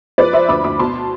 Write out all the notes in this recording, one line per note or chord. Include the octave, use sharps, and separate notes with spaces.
F3 B4 D5
F3 C5 E5
D2 B5 D6
D2 B5 D6
B2 A5 C6